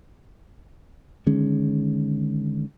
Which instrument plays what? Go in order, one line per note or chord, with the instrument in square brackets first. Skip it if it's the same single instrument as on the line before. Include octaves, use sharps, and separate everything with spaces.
[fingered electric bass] D3 D#3 G#3 C#4